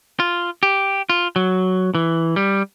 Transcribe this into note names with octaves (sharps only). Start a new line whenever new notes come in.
F4
G4
F4
F#3
E3
G3